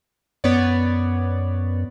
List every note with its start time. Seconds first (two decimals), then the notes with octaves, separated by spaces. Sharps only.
0.44 F#2 B3 C#5 D5